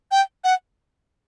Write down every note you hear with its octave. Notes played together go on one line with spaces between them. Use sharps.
G5
F#5